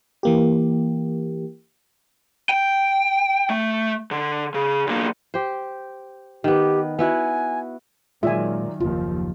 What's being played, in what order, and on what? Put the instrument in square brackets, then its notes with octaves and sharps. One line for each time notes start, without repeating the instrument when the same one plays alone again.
[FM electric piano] E3 A#3 G4
[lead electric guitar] G5
A3
D3
C#3
B1 A#3
[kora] G4 C5
[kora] D#3 B3 [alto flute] G4
[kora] B3 E4 F#4 [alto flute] G#5
[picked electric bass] A#2 G#3 [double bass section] D#3 F#3 [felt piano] F4 D5 [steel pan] E5 G#5
[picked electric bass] F#1 [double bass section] D#2 F3 [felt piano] F4